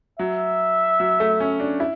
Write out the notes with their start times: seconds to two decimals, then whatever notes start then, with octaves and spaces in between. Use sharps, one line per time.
0.19 F#3 E5
1.00 F#3
1.20 A3
1.40 C#4
1.60 D4
1.80 E4